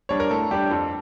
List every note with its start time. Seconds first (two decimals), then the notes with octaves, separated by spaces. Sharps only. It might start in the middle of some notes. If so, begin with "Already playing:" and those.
0.09 G3 D4 C#5
0.20 A#4
0.31 A2 A4
0.51 G3 D4 G4
0.70 F2 A4